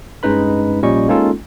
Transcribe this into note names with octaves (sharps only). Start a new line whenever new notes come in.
G2 G#3 C#4 D#4 B4 B5
A#1 A#2 G3 C#4 D#5 C#6
G#3 A#3 C#4 D#4 F4 A4